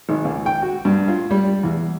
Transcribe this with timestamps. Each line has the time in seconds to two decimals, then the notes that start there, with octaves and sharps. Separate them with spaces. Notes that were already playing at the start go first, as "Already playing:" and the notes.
0.09 G#1
0.25 C#2
0.46 G5
0.62 F#4
0.85 G2
1.08 F4
1.31 G3
1.63 E2